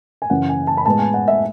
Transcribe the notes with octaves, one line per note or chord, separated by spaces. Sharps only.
G#5
F#2 C#3 E3 F#5
G#5
A5
B5
A2 G#3 B3 A5
G#5
F#5
E5